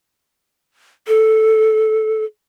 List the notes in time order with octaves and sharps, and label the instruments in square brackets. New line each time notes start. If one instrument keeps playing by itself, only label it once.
[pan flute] A4